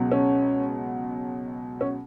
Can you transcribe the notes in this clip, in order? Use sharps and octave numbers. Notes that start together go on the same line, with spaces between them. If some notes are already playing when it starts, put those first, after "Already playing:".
Already playing: C#2 B2 F#3
C#4
C#4